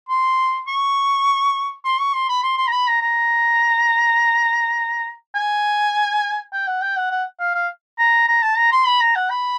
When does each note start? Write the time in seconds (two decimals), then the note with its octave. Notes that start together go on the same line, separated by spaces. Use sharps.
0.09 C6
0.68 C#6
1.85 C6
2.00 C#6
2.14 C6
2.29 B5
2.43 C6
2.58 C6
2.67 A#5
2.72 B5
2.88 A#5
3.02 A#5
5.35 G#5
6.53 G5
6.67 F#5
6.82 G5
6.96 F#5
7.11 F#5
7.40 F5
7.55 F5
7.99 A#5
8.28 A#5
8.42 A5
8.57 A#5
8.72 C6
8.86 B5
9.01 A#5
9.16 F#5
9.30 B5